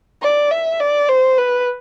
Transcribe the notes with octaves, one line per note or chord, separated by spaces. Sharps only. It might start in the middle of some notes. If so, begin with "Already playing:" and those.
D5
E5
D5
C5
B4